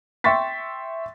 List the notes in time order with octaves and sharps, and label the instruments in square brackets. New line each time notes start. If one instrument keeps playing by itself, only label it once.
[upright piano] E5 G5 C6 C#6 A6 B6